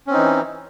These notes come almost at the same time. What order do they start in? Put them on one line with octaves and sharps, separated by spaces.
C#4 C4 D#4 E3